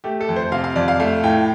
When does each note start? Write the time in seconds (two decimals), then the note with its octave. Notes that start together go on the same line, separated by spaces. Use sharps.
0.04 A3 G4
0.21 A4
0.29 F2
0.36 C5
0.52 C3 F5
0.64 F5
0.76 F2 D5
0.88 F5
1.00 A3 F5
1.24 A2 G5